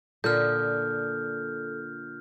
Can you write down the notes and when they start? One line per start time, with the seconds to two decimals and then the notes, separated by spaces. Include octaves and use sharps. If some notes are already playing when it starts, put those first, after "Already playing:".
0.24 A#2 D3 A4 F6 G6